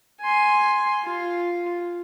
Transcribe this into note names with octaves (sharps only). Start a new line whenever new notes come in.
G#5 C6
F4